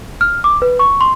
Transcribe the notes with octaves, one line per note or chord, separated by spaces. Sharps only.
F6
D6
B4
C#6
C6